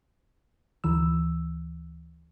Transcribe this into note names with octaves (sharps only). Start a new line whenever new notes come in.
D2 D#3 E3 E6